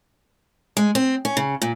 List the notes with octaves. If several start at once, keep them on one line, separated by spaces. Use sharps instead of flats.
G#3
C4
C#4
C#3
A#2